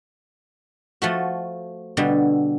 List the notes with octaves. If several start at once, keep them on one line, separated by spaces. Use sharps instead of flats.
F3 A3 F#4
B2 D3 G3